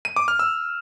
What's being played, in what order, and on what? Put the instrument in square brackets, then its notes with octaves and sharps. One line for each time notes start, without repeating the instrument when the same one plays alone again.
[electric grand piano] D#7
D6
F6
E6